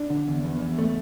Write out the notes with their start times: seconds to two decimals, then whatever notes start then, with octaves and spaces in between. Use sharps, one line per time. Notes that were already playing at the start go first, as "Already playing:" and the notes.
Already playing: D4
0.10 D3
0.27 E2
0.44 E2
0.61 E2
0.79 A3